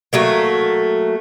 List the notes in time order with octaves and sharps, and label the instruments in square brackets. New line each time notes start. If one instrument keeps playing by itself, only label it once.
[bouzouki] F#3 A3 A#3